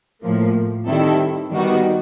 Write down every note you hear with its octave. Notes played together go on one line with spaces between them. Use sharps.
A2 F3 A#3
D#3 G3 C4 E4 A4
D#3 G3 B3 D#4 F#4